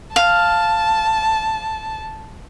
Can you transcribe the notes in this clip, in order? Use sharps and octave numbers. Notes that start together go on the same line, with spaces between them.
F5 A5